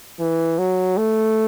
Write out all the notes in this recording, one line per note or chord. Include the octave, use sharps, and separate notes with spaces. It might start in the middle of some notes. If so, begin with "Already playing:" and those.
E3
F#3
A3